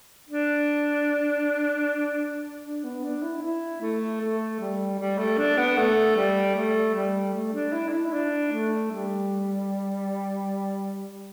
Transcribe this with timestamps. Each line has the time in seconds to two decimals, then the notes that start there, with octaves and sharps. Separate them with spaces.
0.29 D4
2.64 D4
2.84 B3
3.04 D4
3.23 E4
3.43 E4
3.82 A3
4.21 A3
4.60 G3
4.99 G3
5.18 A3
5.38 D4
5.58 B3
5.77 A3
6.16 G3
6.55 A3
6.94 G3
7.34 A3
7.53 D4
7.73 E4
7.88 D4
7.92 E4
8.13 D4
8.52 A3
8.91 G3